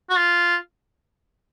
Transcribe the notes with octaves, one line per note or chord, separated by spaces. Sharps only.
F#4
F4